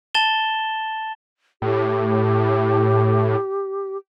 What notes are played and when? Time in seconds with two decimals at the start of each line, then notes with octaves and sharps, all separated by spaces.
0.15 A5 A6 E7 G7
1.62 A2 G4